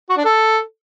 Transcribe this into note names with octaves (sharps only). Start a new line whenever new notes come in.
F#4
D4
A4